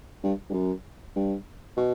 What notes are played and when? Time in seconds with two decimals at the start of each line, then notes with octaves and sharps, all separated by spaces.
0.24 G2
0.50 G2
0.54 F#2
1.16 G2
1.77 B2